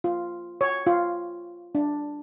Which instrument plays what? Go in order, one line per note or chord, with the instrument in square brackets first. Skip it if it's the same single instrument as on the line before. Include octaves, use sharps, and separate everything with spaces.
[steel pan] F4
C#5
F4
D4